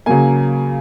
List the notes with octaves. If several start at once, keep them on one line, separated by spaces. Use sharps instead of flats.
C#3 F#3 A#3 G#5